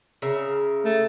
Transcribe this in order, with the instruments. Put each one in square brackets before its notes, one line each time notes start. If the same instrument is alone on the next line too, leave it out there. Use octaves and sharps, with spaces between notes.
[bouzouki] C#3 A#4 E5
[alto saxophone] A3